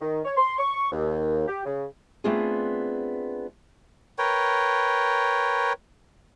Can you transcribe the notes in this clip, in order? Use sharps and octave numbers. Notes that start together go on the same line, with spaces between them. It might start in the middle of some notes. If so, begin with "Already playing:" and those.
D#3
C#5
C6
C#6
D#2
G4
C#3
A3 B3 C4 D4 F4 G#4
A#4 B4 C#5 G5